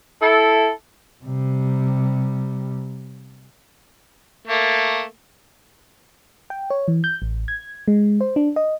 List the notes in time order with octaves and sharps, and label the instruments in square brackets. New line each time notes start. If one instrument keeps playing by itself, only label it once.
[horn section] E4 A4
[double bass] C3 G3
[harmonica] A3 A#3
[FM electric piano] G5
C#5
E3
G6
A1
G#6
G#3
C5
D4
D#5